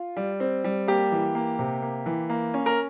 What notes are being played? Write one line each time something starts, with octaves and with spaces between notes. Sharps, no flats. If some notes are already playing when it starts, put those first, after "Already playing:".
Already playing: F4
G3
C4
G3
A#3 G4
E3
A#3
C3
A#3
E3
A#3
C#4
A#4